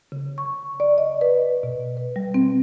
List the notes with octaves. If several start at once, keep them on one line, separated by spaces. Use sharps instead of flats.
C#3
C#6
D5
D#5
B4
B2
B4
G3
C4